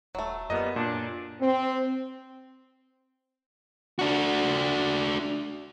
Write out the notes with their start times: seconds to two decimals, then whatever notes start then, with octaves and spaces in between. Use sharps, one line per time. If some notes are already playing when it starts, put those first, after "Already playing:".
0.15 D#1 F#3 A3
0.50 F#2 A#2 G3 B3 D#5
0.76 A#2 D4
1.41 C4
3.99 D4 F#4